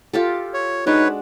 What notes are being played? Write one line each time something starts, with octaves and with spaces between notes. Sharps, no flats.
F4 G4 A4
C#5
G#3 D4 D#4 F#4 B4 C#5